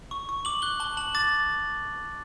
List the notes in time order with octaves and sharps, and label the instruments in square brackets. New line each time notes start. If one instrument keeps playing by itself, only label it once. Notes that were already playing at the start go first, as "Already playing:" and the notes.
[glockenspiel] C#6
C#6
D6 F#7
F#6 G7
A5 G7
A5 F#7
D6 A6